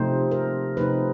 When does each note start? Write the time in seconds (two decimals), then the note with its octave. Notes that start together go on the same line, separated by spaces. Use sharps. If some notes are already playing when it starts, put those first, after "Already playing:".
Already playing: C3 F3 A3 C4 D#4 C5
0.31 A#4
0.77 C3 F3 A3 C4 D#4 B4